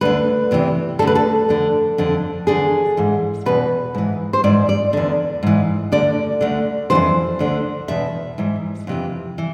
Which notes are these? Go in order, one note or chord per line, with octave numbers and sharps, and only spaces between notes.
D2 D3 B4
E2 C3 E3
D2 D3 A4
B4
A4
F2 D3
F2 D3
E2 D3 G#4
G#2 E3
E2 B2 B4
G#2 E3
C5
G#2 E3 D5
D5
E2 D3
G#2 E3
D2 D3 D5
D2 D3
C3 E3 C5
F2
D2 D3
E2 B2 E5
G#2 E3
F2 C3 E3
E3